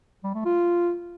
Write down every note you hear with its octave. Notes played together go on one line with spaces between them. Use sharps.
G3
A3
F4